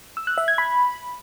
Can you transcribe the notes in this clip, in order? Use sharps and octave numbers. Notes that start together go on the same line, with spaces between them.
E6
F#6
E5
G#6
B5